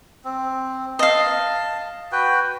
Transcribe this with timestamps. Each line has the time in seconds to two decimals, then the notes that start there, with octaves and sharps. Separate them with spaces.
0.25 C4
0.99 D#5 F5 A5
2.12 F#4 B4 G5